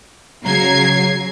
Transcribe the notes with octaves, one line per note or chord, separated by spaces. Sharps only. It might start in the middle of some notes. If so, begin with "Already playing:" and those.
C#3 F#3 A#5 G#6 C7